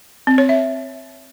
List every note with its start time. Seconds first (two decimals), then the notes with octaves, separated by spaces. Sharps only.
0.27 C4
0.38 C#5
0.49 E5